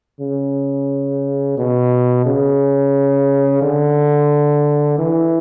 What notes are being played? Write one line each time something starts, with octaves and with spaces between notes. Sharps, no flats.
C#3
B2
C#3
D3
E3